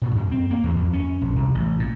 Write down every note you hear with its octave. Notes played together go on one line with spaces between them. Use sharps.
A#2
F#2
C4
A#3
E2
F2
C#4
A#1
C2
A1
A#2